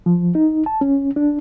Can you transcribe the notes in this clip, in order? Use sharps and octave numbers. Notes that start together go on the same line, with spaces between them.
F3
D#4
A5
C#4
D4